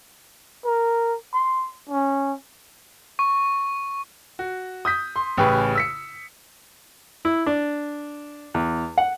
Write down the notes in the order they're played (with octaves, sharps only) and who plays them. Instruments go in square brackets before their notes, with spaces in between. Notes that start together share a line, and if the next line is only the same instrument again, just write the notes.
[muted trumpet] A#4
C6
C#4
[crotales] C#6
[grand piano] F#4
D#6 G6 B6
C6
A1 C#3 G4 G#4 B4 C#6
E6 B6 C#7
[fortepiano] E4
D4
E2
F#5